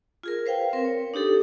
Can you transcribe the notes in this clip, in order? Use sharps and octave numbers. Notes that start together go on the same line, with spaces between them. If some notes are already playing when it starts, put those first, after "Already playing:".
F4 G#4 A#4
B4 C5 F5 G5
C4 A#4 B4
C#5
D4 D#4 G4 A4